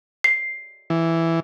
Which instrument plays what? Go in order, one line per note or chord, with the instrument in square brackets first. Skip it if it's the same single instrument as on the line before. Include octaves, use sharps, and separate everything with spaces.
[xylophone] C7
[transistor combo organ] E3